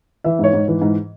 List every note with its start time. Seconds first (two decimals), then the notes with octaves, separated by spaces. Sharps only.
0.24 E3 E5
0.39 G#2 C#5
0.54 G#2
0.68 E3
0.82 G#2